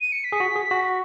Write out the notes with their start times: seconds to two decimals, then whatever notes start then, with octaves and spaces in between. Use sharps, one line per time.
0.01 D#7
0.12 C#7
0.24 B6
0.32 G#4
0.40 F#4
0.56 G#4
0.71 F#4